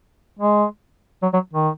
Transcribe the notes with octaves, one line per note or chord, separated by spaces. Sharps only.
G#3
F#3
F#3
D#3